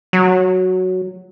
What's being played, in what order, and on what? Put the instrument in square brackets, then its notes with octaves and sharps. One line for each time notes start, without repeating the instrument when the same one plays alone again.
[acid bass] F#3